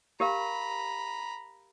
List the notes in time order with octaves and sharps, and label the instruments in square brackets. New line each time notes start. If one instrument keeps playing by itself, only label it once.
[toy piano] G4 A#4 F5 [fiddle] A#5 B5